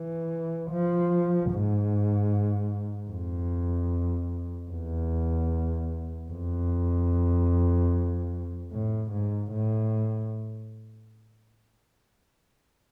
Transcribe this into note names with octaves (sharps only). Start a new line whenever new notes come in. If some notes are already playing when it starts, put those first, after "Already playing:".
Already playing: E3
F3
G#2
F2
E2
F2
A2
G#2
A2